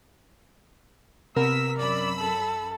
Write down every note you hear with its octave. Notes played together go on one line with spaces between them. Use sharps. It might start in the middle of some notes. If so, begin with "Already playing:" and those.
C3 B3 A#4 E6 B6
F#2 D5 B5 E6
A4